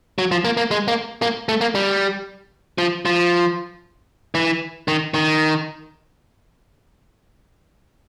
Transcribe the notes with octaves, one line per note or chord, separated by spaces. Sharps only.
F#3
F3
A#3
A#3
G#3
A#3
A#3
A3
A#3
G3
F3
F3
E3
D#3
D#3